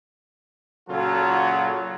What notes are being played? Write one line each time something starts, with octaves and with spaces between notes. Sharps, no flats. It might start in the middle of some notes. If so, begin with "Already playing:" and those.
A#2 C#3 F#3 F4 F#4 A4